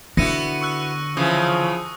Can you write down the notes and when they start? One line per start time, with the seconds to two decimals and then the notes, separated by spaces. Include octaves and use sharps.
0.17 D3 B3 E4 F#4 A#6 C#7 D#7
0.61 C#6 E6 F#6
1.17 C#3 E3 F3 D#6